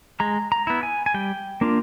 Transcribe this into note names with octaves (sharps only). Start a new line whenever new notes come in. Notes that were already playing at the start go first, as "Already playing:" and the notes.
G#3 A#5
A#5
B3 E4
G#5
G#5
G3 G5
A#3 D4 F4